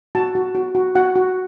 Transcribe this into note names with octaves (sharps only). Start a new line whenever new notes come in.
F#4 A5
F#4
F#4
F#4
F#4 F#5
F#4